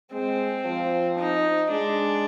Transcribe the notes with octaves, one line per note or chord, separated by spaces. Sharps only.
G#3 C4
F3
D#4
G#3 D4